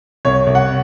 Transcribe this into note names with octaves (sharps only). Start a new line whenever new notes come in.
C2 C#5
C2
F#5